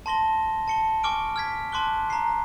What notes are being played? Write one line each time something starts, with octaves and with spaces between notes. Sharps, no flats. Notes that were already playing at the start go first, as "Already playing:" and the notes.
A5 C6 A#6 G7
A5 C#7 G7
G#5 C#6 D6 F6 D7
F6 G#6 B6
A5 C6 D6 F#6 G7
A#5 C7